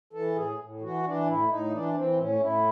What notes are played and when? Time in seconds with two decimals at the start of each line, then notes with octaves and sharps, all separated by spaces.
0.13 E3 A4
0.36 A2 G#4
0.59 A2
0.81 E3 F#4
1.04 E3 D4
1.26 A2 E4
1.49 A2 D#4
1.72 E3 D4
1.94 E3 C4
2.17 A2 C#4
2.40 A2 E4